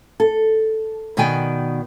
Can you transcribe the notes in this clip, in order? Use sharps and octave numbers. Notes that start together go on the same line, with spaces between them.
A4
B2 D#3 B3 D5 G5 G#5